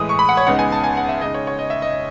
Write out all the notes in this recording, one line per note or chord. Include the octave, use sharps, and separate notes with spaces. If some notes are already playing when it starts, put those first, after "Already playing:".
Already playing: A2 E3 G#3 D#6
C#6
B5
F#5
C#5
C#2 C#3 G#3 B3 D#4 F#5
G#5
A5
G#5
F#5
E5
C#3 G#3 D#4 D#5
C#5
C#5
D#5
E5
D#5